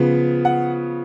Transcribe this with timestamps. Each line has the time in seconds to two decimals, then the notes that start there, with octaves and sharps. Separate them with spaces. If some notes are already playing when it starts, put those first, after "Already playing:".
Already playing: C#3 F3 B3
0.45 F#5